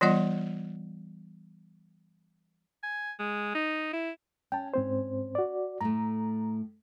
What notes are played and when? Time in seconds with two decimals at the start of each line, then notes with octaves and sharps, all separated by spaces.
0.01 E3 G3 B3 F4 D#5 F#5
2.83 G#5
3.19 G#3
3.55 D#4
3.93 E4
4.52 C#4 G5 A5
4.74 G#2 C4 C5
5.35 F#4 D5
5.81 A2 A3 A#5